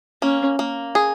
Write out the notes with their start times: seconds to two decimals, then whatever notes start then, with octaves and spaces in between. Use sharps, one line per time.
0.22 A#3 C#4
0.59 A#3
0.95 G#4